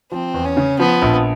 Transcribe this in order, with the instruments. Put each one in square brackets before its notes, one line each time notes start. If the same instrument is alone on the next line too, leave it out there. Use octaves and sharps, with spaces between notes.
[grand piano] F3 [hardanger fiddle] C4
[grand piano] E2
[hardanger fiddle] C#4
[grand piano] C#3
[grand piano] F3 [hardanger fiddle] B3
[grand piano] A#1